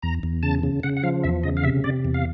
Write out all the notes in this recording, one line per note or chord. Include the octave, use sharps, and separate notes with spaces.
E2 A#5
E2
C#3 A5
C#3
C#3 F#5
F#5
F3 F5
E2 E5
C#3 D#5
F5
C3 E5
C3 D5
E2
F5